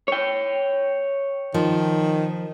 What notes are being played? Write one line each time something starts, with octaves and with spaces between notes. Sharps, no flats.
C#5 G5
D#3 F3